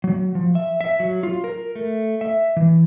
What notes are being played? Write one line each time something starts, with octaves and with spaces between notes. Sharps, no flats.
F#3
F3
E5
E5
F#3
F4
A#4
A3
E5
E3